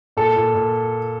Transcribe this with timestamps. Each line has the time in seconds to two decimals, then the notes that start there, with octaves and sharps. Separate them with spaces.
0.17 A#2 A4
0.36 A#2
0.55 A#2